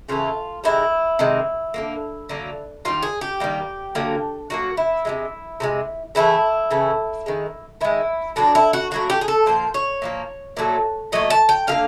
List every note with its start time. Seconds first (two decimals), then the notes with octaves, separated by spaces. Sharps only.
0.09 C#3 E3 A3 F4
0.64 C3 D#3 G#3 E4
1.19 C3 D#3 G#3
1.74 D3 F#3 A#3
2.29 D3 F#3 A#3
2.85 D#3 G3 A#3 F4
3.02 G#4
3.21 G4
3.40 D#3 G3 A#3
3.95 D3 F#3 A#3
4.50 D3 F#3 A#3 F#4
4.77 E4
5.05 C3 F3 G#3
5.60 C3 F3 G#3
6.15 C#3 E3 A3 E4
6.71 C#3 E3 A3
7.26 D#3 G#3
7.81 D#3 G#3 E4
8.36 A2 F#3 A#3 D4
8.55 E4
8.73 F#4
8.91 A2 F#3 A#3 F#4
9.10 G4
9.21 G#4
9.28 A4
9.46 A#2 F3 A#3 C5
9.74 C#5
10.02 A#2 F3 A#3
10.57 A#2 F#3 A3
11.12 A#2 F#3 A3 D#5
11.30 A5
11.49 G5
11.67 D3 F3 A#3 F5